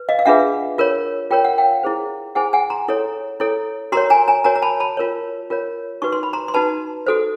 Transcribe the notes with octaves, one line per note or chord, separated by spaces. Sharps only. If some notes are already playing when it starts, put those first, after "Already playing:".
Already playing: B4
D#5 F5
F5
D4 F4 G#4 B4 E5 F#5
F4 A#4 C#5
F4 A#4 C#5 G5
F#5
F5 G5
E4 G#4 C5
E4 G#4 C5 F#5 G#5
F#5 G#5
A#5 C6
E4 A4 C#5
E4 A4 C#5
F#4 A#4 C#5 A#5 C6
G#5 A#5
G#5 A#5
F#4 A#4 C#5 G#5 A#5
A#5
A5 B5
A5 B5
F4 A#4 C#5
F4 A#4 C#5
D#4 F#4 B4 C#6
C6
B5
A#5 C6
C6
D#4 F#4 B4 A5 B5
F#4 A4 C5